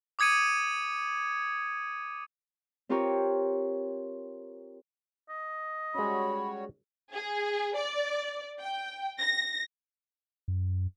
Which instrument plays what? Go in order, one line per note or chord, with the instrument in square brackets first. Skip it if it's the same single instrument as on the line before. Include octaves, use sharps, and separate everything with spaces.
[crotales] D6 D#6 G#6 C#7 D#7
[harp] C4 F4 G4 A#4 C#5
[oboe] D#5
[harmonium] G3 F#4 C#5 [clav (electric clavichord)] G#3 C#4 [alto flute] B5
[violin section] G#4
D5
G5
A#6
[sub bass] F#2